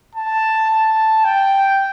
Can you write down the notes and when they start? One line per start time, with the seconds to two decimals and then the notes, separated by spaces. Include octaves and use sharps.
0.15 A5
0.70 A5
1.25 G5